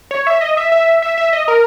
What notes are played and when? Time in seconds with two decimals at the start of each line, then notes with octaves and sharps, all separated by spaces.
0.11 C#5
0.27 E5
0.41 D#5
0.57 E5
0.72 E5
1.02 E5
1.18 E5
1.33 D#5
1.48 A#4